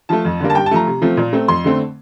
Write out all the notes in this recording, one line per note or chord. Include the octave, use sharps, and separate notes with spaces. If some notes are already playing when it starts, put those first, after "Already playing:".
F3 A3 A5
F2
D3 G3 A#3
A5
G2 G5
A5
F3 A3 A#5
C3
F3 A3 C4
A#2
A3 C4
F2 C6
D3 A3 C4